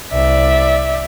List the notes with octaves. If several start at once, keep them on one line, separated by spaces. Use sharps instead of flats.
C2 D5 E5